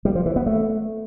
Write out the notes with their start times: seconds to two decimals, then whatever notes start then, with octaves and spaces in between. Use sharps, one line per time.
0.05 G3
0.15 F3
0.26 E3
0.36 B3
0.46 A3